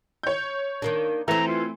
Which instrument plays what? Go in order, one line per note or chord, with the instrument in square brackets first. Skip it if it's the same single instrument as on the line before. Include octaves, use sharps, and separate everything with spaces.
[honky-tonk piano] C#5 G6
[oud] D#3 A#3 D4
[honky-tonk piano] E3 [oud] A3 C4 [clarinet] A#5
[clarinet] F4